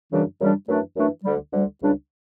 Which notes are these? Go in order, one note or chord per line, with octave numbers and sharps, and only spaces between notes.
F#2 C#3 E3 G3 D4
F#2 C#3 E3 G3 D4
F#2 E3 A3 D4
F#2 E3 A3 D4
D2 D3 G3
D2 D3 G3
C#2 C#3 G3 D4